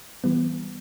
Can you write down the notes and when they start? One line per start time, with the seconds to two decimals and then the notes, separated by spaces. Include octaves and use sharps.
0.24 E3 G3 B3